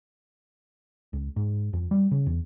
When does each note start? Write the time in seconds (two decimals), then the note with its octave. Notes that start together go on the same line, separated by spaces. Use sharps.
1.13 C#2
1.36 G#2
1.73 F2
1.91 G3
2.11 C#3
2.26 E2